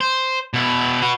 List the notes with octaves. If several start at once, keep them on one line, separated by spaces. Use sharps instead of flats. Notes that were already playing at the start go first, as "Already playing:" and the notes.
C5
B2 E4
F#4 B4